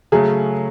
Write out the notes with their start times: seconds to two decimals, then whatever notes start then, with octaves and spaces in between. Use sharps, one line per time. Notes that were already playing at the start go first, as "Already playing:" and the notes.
0.12 C#3 F#3 A3 C#4 G#4